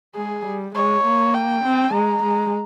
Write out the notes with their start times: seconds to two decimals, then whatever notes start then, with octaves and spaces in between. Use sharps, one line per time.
0.15 G#3 G#4
0.45 G3
0.75 G#3 C#5
1.04 A#3
1.35 G5
1.64 C4
1.94 G#3 A#5
2.23 G#3